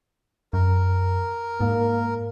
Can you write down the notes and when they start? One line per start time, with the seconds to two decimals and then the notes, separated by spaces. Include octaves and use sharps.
0.53 F#2 A#4
1.61 G#2 A#3